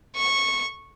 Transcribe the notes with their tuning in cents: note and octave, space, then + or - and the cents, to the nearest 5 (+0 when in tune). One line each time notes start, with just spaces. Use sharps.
C#6 -15